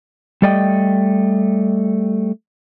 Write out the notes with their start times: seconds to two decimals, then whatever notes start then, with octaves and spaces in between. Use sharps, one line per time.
0.42 G3 A3 D5 D#5 G5